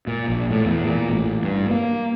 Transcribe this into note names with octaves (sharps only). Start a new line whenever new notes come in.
A#2
A#1
A2
E2
A#2
A1
G2
A#3